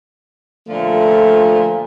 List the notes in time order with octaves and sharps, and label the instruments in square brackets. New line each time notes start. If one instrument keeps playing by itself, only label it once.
[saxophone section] A#2 D3 F3 [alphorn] A3